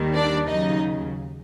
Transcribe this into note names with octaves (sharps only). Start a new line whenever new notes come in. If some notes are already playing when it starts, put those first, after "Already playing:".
Already playing: D#2 D#3 G3
D4 D5
D#2 C#3 F#3 D#4 D#5